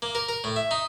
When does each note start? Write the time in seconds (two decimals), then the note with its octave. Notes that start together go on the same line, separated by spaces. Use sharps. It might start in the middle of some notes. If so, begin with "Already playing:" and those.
0.02 A#3
0.15 A#4
0.29 A#4
0.44 A2
0.56 E5
0.71 D#4